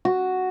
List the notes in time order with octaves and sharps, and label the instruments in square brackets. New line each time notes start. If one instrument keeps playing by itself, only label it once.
[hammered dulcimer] F#4